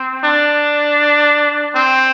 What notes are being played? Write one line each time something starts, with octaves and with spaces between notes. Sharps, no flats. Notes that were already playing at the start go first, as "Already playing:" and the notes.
Already playing: C4
D4
C4